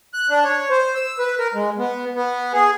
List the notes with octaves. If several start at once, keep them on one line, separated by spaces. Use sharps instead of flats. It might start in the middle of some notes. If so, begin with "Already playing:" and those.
F#6
D4
C#5
C5
E6
B4
A#4
G#3
B3
B3
G#4